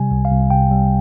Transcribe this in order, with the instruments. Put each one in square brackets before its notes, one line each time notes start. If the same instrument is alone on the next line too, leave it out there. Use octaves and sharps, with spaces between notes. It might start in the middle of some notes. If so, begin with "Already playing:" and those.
Already playing: [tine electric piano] C3 G3 G#5
C2
F5
C2
C3 G5
G3